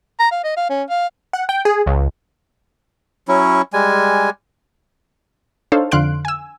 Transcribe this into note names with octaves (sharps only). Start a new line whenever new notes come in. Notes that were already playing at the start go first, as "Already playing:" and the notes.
A#5
F5
D#5
F5
C#4
F5
F#5
G5
G#4
C#2
F#3 C#4 E4
G3 G#3 G#5
D4 D#4 A4 C5 C#5 F5
F2 D3 F5 C6 F#6 D7
G#5 E6